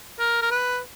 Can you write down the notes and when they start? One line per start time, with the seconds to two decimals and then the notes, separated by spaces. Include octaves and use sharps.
0.19 A#4
0.42 A#4
0.51 B4